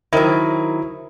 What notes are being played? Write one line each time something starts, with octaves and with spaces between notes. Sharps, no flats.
D#3 F#3 E4 A#4 C5